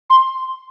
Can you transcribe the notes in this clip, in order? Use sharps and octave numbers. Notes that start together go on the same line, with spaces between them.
C6